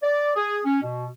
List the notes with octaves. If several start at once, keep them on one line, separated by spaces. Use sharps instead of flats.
D5
G#4
C#4
B2